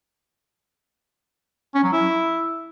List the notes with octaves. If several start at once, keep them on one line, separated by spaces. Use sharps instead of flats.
C#4
F#3
E4